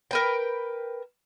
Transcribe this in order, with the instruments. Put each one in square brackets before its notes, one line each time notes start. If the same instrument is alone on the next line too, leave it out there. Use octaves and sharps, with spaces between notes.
[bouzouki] A#4 B4 G5